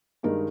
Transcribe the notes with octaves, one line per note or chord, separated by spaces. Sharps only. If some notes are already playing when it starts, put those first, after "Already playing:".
G2 D#3 G#3 D#4 A#4